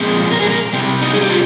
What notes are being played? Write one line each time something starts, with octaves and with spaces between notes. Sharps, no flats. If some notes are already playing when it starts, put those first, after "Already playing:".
Already playing: A#2 F3 G#3 C4
A#4
G#4
A#4
C3 G3 C4
D#4
G#4
G4
F4